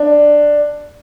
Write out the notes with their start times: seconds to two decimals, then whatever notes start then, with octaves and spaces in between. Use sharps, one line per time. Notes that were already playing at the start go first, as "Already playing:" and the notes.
Already playing: D4